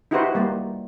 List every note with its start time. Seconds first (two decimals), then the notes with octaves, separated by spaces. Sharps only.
0.11 D#4 E4 F#4 G4 B4 C5
0.35 G3 A#3